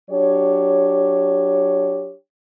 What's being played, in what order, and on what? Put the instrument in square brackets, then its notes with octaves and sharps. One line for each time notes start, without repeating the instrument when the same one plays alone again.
[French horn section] F#3 D4 G4 C#5